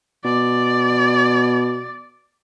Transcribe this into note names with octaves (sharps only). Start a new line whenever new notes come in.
B2 D5